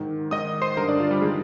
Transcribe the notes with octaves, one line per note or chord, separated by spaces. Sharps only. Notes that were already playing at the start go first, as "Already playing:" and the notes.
Already playing: G#2 D#3
G#2 D#3 D#5 D#6
C5 C6
G2 D3 A#4 A#5
D4 D5
F4
G3 G4
G#3 G#4
D#3